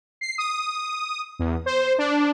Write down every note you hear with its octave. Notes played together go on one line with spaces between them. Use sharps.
C7
D#6
E2
C5
D4